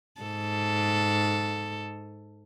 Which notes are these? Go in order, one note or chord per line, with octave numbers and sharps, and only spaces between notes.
G#2 A4